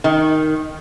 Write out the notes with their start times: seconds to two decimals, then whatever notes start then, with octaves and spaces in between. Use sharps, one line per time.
0.04 D#3